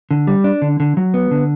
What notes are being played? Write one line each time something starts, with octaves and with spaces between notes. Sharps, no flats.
D3
G3
D4
D3
D3
F#3
B3
D3